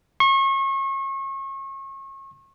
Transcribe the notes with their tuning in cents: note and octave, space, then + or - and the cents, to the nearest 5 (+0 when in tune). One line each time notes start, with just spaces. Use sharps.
C#6 -35